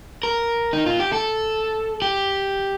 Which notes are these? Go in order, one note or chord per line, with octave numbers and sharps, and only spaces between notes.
A#4
D#4
F4
G4
A4
G4